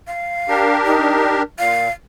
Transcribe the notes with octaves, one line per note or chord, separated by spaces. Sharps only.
F5
D4 G4 A#4
D#4
A#2 F5